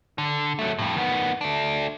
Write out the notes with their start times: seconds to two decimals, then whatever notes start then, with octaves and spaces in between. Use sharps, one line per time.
0.18 D3
0.59 F#3 A3
0.79 F2 A2
0.96 D#3 B3
1.41 A3 D4